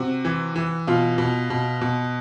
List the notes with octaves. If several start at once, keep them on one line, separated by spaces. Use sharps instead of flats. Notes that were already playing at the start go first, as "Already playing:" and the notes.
Already playing: C3 F#4
E3
E3
B2 F4
B2
B2
B2